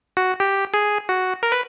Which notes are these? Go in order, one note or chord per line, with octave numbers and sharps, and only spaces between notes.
F#4
G4
G#4
F#4
A#4
B4